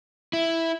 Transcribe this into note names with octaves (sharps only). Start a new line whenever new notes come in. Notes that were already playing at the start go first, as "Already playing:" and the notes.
E4